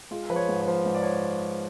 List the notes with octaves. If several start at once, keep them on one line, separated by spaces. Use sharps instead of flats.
G#3 F4
F3 B4
C#5
G#2
C#5
F3
G#2
D5
C#5